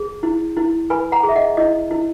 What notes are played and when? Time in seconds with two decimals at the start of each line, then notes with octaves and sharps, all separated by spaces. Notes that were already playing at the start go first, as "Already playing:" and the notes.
Already playing: G#4
0.23 E4
0.57 E4
0.90 B4 G#5 B5
1.12 F#5 A#5
1.23 G#4
1.29 E5
1.36 D#5 F#5
1.57 E4 D#5
1.91 E4